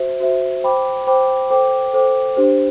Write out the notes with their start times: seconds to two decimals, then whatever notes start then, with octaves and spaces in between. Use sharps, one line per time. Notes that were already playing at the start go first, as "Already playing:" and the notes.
Already playing: F#4 C5 E5
0.20 F#4 C5 E5
0.63 C5 G5 B5 D6
1.07 C5 G5 B5 D6
1.50 A4 C5 G5 D6
1.93 A4 C5 G5 D6
2.37 D4 G4 C5